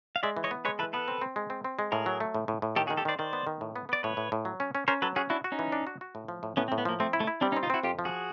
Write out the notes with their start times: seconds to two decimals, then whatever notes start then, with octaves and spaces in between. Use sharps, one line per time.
0.16 F5
0.23 G#3 D5 E5
0.37 E3
0.44 C#5 D#5
0.51 B3
0.65 G#3 B4 C#5
0.79 E3 A4 B4
0.93 B3 A4 B4
1.08 C4
1.22 C4
1.36 G#3
1.50 C4
1.64 C4
1.79 G#3
1.92 A2 G#4 A#4
2.06 F#3
2.20 A3
2.34 A2
2.48 A2
2.62 A2
2.76 D#3 G4 A4
2.87 F#4 G#4
2.90 D#3
2.97 G4 A4
3.05 D#3 C5 D5
3.19 D#3 C5 D5
3.33 B3
3.47 D#3
3.61 A2
3.76 B3
3.89 B3 D5
4.03 A2 B4 C#5
4.17 A2
4.32 A2
4.45 F#3
4.60 C#4
4.75 C#4
4.88 C#4 A#4 C5
5.02 F#3 A4 B4
5.16 C#4 F#4 G#4
5.30 D4 E4 F#4
5.44 F#4
5.52 C#4 D#4
5.59 E3
5.72 D4
5.87 F#4
6.01 F#4
6.15 A2
6.28 F3
6.43 A2
6.57 A2 B3 C#4
6.68 C4
6.72 A2
6.78 B3
6.85 F3 A#3
7.00 A3 C4
7.13 E4
7.20 A3
7.27 E4
7.41 G3 C4 D4
7.52 C#4 D#4
7.56 C4
7.63 D#4 F4
7.70 C4 E4 F#4
7.83 F2 F4 G4
7.99 F3
8.05 F#4 G#4